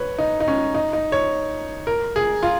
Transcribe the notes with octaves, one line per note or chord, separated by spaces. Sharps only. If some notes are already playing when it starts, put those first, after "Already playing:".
Already playing: B4 C#5
D#4
D#4
C#4
D#4
D#4
C#5
A#4
G#4
F4